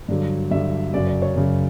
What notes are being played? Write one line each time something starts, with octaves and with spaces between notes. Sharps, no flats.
G2 D3 F#3
G2 D3 F#3 E5
F#2 C#3 F#3 D5
D5
C#5
F#2 C#3 F#3